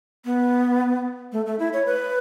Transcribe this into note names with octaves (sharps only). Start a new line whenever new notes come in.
B3
A3
A3
E4
C#5
B4